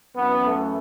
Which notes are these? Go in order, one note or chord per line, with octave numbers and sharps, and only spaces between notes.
F#2 E3 B3
A3